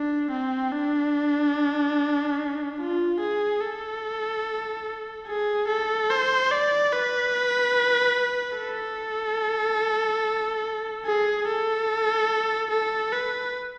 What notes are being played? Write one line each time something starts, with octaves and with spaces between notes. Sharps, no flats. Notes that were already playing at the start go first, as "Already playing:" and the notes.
Already playing: D4
C4
D4
F4
G#4
A4
G#4
A4
C5
D5
B4
A4
G#4
A4
A4
B4